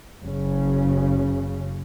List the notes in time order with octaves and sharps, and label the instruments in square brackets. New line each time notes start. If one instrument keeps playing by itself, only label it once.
[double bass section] F#1 C#3